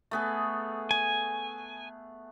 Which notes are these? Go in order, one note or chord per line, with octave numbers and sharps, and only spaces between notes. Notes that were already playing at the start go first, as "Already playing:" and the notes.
A3 B3 G#4
G#5